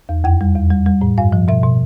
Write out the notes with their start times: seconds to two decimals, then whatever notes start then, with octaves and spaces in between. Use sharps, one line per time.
0.09 E2
0.24 F2 G5
0.41 G3
0.56 E2
0.70 G3
0.86 G3
1.01 A2
1.18 G2 F5
1.32 F3
1.48 B2 E5
1.63 B2